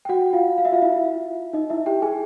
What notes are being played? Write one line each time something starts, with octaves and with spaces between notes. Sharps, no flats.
G5
F#4 F#5
F4 F5
F5
E5
F4 F5
E4 E5
D#4 D#5
E4 E5
G4 G5
G#4 G#5